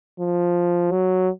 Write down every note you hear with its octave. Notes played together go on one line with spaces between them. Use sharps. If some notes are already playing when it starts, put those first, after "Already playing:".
F3
F#3